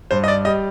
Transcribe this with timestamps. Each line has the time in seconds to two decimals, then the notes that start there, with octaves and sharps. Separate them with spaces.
0.11 G2 C5
0.24 D#5
0.28 D5
0.45 G3 D#5